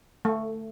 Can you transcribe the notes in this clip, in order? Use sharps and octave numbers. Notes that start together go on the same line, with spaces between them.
A3